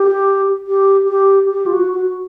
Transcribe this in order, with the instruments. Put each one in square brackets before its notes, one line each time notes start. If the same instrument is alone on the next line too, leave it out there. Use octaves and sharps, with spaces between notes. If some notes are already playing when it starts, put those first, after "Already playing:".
Already playing: [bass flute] G4
G4
G4
G4
F4
F#4
F#4